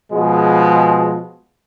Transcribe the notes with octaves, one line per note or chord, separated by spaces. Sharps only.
B2 F3 G#3